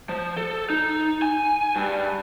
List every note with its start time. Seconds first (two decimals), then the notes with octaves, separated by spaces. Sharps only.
0.09 F3
0.37 A4
0.70 D#4
1.22 G#5
1.76 G2